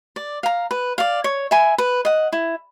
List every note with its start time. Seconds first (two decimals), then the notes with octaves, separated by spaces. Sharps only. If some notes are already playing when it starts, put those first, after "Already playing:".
0.16 D5
0.43 F5 A#5
0.71 B4
0.98 D5 F5
1.24 C#5
1.51 E5 G#5 B5
1.78 B4
2.05 D#5 F#5
2.33 E4